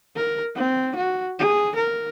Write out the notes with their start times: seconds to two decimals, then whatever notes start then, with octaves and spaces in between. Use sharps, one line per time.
0.16 A#4
0.56 C4
0.96 F#4
1.39 G#4
1.75 A#4